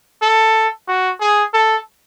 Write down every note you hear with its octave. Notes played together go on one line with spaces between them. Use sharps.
A4
F#4
G#4
A4